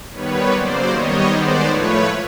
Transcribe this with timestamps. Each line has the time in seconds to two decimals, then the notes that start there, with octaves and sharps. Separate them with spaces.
0.12 D#3 G3 B3 B4 C#5
0.50 C#3 F#3 A#3 C5 D5
0.89 D#3 G3 B3 C#5 D#5
1.27 D#3 G#3 B3 C5 D5
1.66 A2 F3 A3 B4 C#5